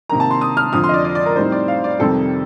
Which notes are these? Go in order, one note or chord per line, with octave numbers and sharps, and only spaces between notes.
C3 D#3 A#3 A#5
A5
C6
D#6
F6
F2 D3 F3 D#6
C6
D#5
D5
D5
D5
A#4
A2 G3 C4 D#4 C5
D5
F5
D5
F2 C3 D#3 G3 C4 A4